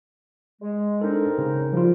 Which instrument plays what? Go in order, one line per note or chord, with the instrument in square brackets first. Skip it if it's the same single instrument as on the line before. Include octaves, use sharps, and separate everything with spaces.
[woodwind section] G#3
[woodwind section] C4 D#4 A#4 [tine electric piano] D4 A4
[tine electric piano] C#3
[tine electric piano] F3 F4 [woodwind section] G3